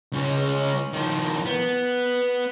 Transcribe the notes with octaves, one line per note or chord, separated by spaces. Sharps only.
C#2 C#4
D#3 F3
B3